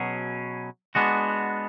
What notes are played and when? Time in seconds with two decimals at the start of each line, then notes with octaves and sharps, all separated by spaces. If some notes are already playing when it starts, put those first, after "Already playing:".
Already playing: B2 F#3 C#4 G#4
0.95 G#3 B3 D4 F#4